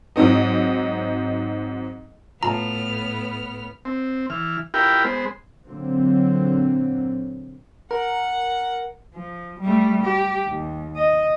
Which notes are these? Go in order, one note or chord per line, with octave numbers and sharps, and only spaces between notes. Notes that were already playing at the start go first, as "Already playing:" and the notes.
G#2 F#3 C4 D#4
A2 B3 F4 A5 A#5 F6
C4
E3 F6
E4 F4 G4 A#4 G5 B5
G#3 B3 C5
A#2 D3 F#3 A#3 C4
A#4 F#5
F3
G3 A3
G4
D#2
D#5